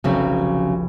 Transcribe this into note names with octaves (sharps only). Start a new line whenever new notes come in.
F1 B1 C#3 F#3 C4 E5